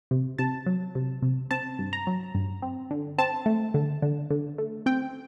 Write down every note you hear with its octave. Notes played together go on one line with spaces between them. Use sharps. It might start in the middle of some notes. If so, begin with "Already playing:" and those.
C3
C3 A5
F#3
C3
C3
C4 A5
G2
A#5
F#3
G2
C4
D3
C4 A5
A3
D3
D3
D3
A3
C4 G5